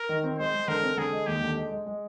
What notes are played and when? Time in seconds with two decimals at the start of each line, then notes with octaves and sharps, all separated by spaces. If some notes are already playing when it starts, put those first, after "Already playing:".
Already playing: A#4
0.09 D#3
0.24 C4
0.39 G#3 C5
0.54 G#3
0.68 D3 A#4
0.83 C4
0.97 D3 G#4
1.13 G#3
1.27 D#2 G4
1.42 D3
1.57 G#3
1.72 G#3
1.86 G#3